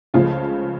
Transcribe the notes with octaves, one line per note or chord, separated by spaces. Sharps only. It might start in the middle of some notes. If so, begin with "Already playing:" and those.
C#2 C#3 F3 A3 F4